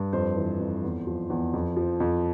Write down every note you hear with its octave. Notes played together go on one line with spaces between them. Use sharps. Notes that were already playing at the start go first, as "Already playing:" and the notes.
Already playing: G2
F2 C5
E3
F2
E2
F3
E2
F2
F3
F2